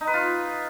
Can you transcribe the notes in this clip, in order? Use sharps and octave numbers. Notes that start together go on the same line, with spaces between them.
D#4
B4
F4